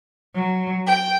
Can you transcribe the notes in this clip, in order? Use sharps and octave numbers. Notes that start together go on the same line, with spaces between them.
F#3
G5